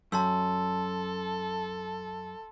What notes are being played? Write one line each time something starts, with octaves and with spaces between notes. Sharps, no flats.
F#2 A4 A5 C6 E6